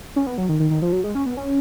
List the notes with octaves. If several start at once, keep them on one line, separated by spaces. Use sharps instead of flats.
C#4
B3
F#3
D#3
D#3
D#3
F3
F#3
G#3
C#4
B3
C#4